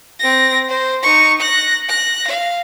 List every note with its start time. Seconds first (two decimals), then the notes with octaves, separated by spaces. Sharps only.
0.20 C4 A#6
0.69 C5
1.03 D#4 C#6
1.41 F#6 A#6
1.89 F#6 A#6
2.28 F5